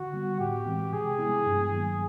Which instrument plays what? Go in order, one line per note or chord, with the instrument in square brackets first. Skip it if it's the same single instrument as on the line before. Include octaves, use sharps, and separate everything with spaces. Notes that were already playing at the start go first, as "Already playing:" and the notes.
Already playing: [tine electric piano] D3 [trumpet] F#4
[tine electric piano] G3 B3
[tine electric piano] A2 [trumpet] G4
[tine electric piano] E3 G#3 C4
[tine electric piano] C3 [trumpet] G#4
[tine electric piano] F3 G#3 B3 E4
G2
D#3 F#3 A#3